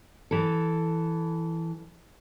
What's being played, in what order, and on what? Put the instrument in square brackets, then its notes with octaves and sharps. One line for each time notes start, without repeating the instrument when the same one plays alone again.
[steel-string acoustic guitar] E3 A4